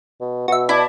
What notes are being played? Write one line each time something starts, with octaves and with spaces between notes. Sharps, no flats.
B2
B2 F#4 E5
E4 D5 A5 D6